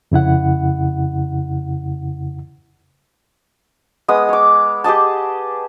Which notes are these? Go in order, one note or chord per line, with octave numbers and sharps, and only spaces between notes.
F2 C#3 E4 F#5
G#3 B3 D#6
C#5 D6
G4 G#4 D#5 A5